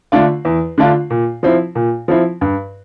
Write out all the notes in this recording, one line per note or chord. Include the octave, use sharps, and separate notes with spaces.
D3 A3 D4 F4
E2
D3 A3 D4 F4
A#2
F3 C4 E4
A#2
F3 C4 E4
G2